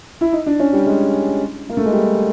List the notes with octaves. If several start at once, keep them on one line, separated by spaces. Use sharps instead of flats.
E4
D#4
D4
C#4
G3
G#3
A#3
A3
G#3
G3